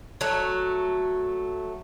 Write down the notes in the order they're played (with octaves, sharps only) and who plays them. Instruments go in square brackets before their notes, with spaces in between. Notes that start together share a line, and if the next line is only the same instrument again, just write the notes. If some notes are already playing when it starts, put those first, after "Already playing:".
[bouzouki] F#3 A3